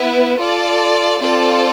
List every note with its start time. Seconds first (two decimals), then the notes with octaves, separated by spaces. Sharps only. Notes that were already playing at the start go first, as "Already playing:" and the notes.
Already playing: B3 E4 B4
0.39 F4 A4 D5
1.20 C4 F4 A4 D5